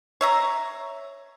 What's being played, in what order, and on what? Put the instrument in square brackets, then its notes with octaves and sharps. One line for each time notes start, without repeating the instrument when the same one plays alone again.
[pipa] C#5 E5 A#5